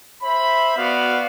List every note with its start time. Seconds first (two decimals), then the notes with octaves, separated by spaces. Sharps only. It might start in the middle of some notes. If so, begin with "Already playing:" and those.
0.23 C5 E5 B5
0.77 B3 F#4 D5 F5